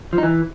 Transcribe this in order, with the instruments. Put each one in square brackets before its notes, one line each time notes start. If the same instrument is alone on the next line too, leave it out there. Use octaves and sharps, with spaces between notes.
[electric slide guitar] F3
D#4
E3